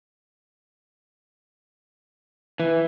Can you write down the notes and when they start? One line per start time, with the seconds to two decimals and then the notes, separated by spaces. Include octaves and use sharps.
2.60 E3